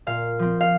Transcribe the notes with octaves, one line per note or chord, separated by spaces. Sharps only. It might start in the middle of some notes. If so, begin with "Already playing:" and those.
A#2 F5
F3 C4
F5